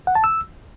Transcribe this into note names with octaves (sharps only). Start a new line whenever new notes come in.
F#5
A5
E6